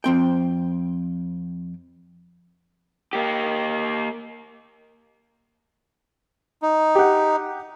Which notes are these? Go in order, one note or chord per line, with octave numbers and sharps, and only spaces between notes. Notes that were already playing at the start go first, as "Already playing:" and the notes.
F2 C4 G5
A#3 G4
D#4
G4 F#5